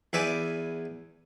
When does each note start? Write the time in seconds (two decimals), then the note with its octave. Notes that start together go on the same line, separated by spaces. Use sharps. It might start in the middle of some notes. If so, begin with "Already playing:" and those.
0.13 E2 B4 D5 E5 G#5 D6